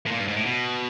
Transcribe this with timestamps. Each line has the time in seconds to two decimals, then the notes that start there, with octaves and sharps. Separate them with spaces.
0.06 A2
0.11 A#2
0.19 G2
0.28 G#2
0.36 A2
0.46 B2